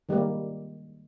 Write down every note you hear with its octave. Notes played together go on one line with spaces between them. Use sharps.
D#3 G3 G#3 A#3